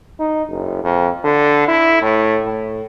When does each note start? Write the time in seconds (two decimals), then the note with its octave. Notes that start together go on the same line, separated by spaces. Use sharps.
0.19 D#4
0.49 F#1
0.84 F2
1.24 D3
1.68 E4
2.02 A2
2.46 A2